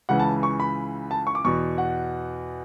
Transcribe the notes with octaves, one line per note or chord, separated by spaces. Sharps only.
C#2 C#3 E3 F#5
A5
C#6
B5
A5
C#6
D6
E2 B2 C#6
F#5